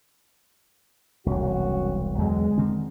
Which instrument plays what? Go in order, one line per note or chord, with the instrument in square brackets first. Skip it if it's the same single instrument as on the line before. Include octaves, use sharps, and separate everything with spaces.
[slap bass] E1 C2 [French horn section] F#2 F#4 C#5
[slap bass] E2 D3 F#3 [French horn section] G#3
[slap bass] D3 D#3 C4